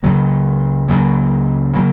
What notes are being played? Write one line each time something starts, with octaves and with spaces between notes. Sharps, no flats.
C#2 C#3 F#3 A#3
C#2 C#3 F#3 A#3
C#3 F#3 A#3